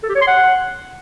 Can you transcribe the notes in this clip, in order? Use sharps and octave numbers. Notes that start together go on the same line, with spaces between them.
A4
G4
C#5
C6
F#5